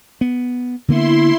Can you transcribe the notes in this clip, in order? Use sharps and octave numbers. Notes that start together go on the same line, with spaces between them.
B3
D3 A#3 B3 E4 C6